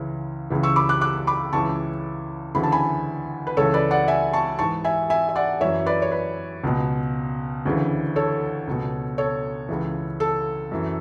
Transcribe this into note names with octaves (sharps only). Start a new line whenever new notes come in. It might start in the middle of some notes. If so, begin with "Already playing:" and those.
Already playing: C#2 C#3 E3
C#2 C#3 E3
C#6 E6
B5 D6
D6 F#6
D6 F#6
B5 D6
C#2 C#3 E3 A5 C#6
D2 C#3 E3 B5
A5
G#5 B5
B4
C#2 C#3 E3 A4 C#5
B4 D5
D5 F#5
E5 G#5
A5 C#6
G#2 E3 A5 C#6
E5 G#5
E5 G#5
E5
D5 F#5
F#2 E3 C#5 E5
B4 D5
C#5
B4
C#2 B2
D2 C#3 E3
A4 C#5
C#2 B2
A4 C#5
C#2 C#3 E3
A4
F#2 E3